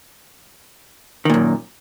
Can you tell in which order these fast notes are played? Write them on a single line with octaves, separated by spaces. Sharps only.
D#3 A#2 F#2